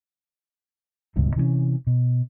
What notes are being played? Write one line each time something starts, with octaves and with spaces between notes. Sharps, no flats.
D1 C#2 G2 B2
C3 E3 A3 C#4
B2